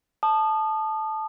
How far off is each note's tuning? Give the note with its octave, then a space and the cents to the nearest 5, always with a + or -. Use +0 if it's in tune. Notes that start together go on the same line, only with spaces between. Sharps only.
A5 -10 D#6 -30